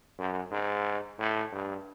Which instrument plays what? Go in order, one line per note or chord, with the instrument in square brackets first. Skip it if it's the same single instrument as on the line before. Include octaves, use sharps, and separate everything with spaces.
[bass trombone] F#2
G#2
A2
G2